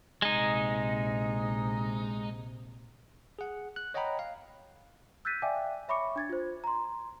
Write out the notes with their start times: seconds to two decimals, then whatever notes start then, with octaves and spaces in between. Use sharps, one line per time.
0.22 A#1 C3 G#3 D#4
3.39 G#4 F#5
3.76 F#6
3.94 C#5 D#5 F#5 G5 A#5 B5
4.19 F5
5.25 E6 F#6 G6 A6 B6 D#7
5.42 D5 E5 F5 G5 G#5 D6
5.88 C#5 E5 B5 C#6 D6 C#7
6.16 D4 G#6 A6
6.29 F4 C5
6.64 A#5 C6